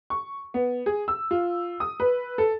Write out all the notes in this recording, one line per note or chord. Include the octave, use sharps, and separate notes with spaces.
C#6
B3
G#4
E6
F4
D#6
B4
A4